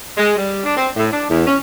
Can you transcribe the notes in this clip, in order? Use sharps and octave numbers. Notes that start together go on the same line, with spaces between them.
G#3
G3
D4
C4
A2
D4
E2
C#4